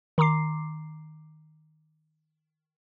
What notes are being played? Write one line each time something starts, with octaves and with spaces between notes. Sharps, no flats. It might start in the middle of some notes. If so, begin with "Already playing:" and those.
D#3 A#5 C6 D6 C7